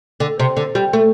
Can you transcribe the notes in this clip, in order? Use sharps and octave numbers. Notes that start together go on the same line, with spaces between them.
D3
C3
D3
G3
A3